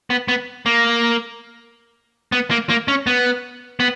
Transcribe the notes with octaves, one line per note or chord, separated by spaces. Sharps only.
B3
B3
A#3
B3
A#3
A#3
C#4
B3
B3